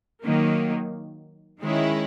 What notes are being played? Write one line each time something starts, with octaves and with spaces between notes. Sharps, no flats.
D#3 F#3 A#3
D#3 G#3 C#4 E4